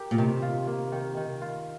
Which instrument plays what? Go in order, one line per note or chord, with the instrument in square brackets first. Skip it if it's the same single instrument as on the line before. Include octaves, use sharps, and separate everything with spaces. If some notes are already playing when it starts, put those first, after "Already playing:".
Already playing: [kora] G4 A#4
[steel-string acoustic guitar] A#2
[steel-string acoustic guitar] C3 [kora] D#3
[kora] F4
A#3
D#3
D#3
F4